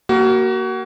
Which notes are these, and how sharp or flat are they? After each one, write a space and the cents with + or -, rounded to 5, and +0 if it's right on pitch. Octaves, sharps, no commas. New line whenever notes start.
A#3 +0 F#4 +30